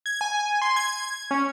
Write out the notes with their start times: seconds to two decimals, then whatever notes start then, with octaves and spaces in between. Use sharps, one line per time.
0.06 G#6
0.21 G#5
0.62 C6
0.76 G#6
1.31 C#4